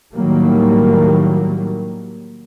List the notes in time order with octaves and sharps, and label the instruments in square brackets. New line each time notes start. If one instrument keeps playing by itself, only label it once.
[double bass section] A2 D#3 F#3 G3 A#3